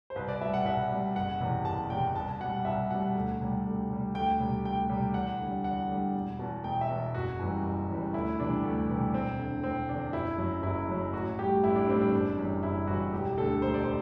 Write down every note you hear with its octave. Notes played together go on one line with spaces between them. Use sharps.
C5
C2 B4
D5
B2 G3 E5
F#5
C2 E5
B2 G3
F#1 F#5
E2 C3 E3
F#1 A5
E2 C3 E3 G5
C2 A5
B2 G3 F#5
C2 E5
B2 G3 F#5
D2
C3 G3
D2
C3 G3
D2 G5
C3 G3
D2 G5
C3 G3
E2 F#5
D3 G3
E2 F#5
D3 G3
E1
E2 B2
E1 G5
E5
E2 B2
F#1 F#4
F#2 E3 G3
F#1
F#2 E3 G3
D2 E4
C3 E3 G3 D4
D2
C3 E3 G3
E1 C4
E2 D3
E1 C4
E2 D3 D4
F#1 E4
F#2 F#3
F#1 E4
F#2 F#3
A1 F#4
A2 G3 G4
A1 E4
D4
A2 G3 C4
D4
F#1
F#2 E3 G3
F#1 E4
F#2 E3 G3 F#4
E1 G4
D2 D3 A4
E1 C5
D5
C5